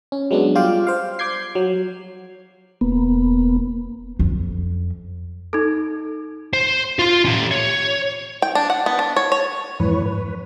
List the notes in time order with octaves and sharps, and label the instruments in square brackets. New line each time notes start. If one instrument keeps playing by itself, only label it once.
[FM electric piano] C#4
F#3 G#3 B3 D4
G3 F4 F5 G5 D6
C5 F5
D6 G6 G#6 C7
F#3
[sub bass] E1 [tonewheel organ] A#3 B3
[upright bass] F2
[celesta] D#4 A4
[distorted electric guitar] C5
F4 C6
C#4 G4
C#5
[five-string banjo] G5
D4
F#5
B3
D4
C#5
C#5
[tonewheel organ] F2 G#2 E3 B4 C#5
B4